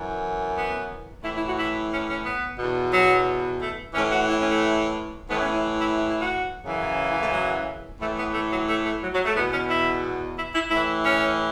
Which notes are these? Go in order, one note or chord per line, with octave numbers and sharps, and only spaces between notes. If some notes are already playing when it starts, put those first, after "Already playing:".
Already playing: F#2 E3
B3
A2 E3 E4
E4
F#4
E4
C#4
C#4
B3
E2 B2
F#3
A3
A2 E3 C#4
F#4
E4
C#4
A3
A2 E3 B3
C#4
E4
E4
E4
E4
F#4
F#2 C#3 E3
E4
A3
F#3
A2 E3 A3
B3
A3
F#3
A3
A3
F#3
F#3
A3
E2 B2 B3
C#4
E4
E4
E4
A2 E3 E4
C#4